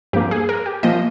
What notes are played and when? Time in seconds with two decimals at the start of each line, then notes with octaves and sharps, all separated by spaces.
0.13 G2 F3 A#3 G4
0.31 G#4
0.49 A#4
0.66 G4
0.83 A#2 F3 A#3 D#5